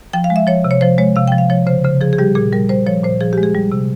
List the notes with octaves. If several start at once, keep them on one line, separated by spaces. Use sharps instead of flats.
F3 G5
F5
G#3
E5
F3 C#5
C3
C#5
F3 C5
G#3 C#5
C3 F5
G5
F3
F5
F3 C#5
C#3 C5
C#3 C5
F3 G#4
G#4
G3 G4
A#2 G#4
G3 A#4
G3 C5
F3 C#5
A#2 C5
F3 G#4
G4
G#3
G#4
G3
C3